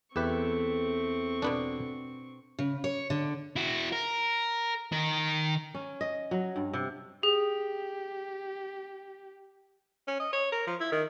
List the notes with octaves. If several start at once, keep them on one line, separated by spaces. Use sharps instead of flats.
E2 A3 C4 G4 A4 B4 C#6
B2 B3 D4
C#3
C#5
D3
E4 F#4
A#4
D#3 A#4
C#4
D#5
F#3
G2
C3
G4 G#4
C#4
D#5
C#5
A#4
F3
E4
D#3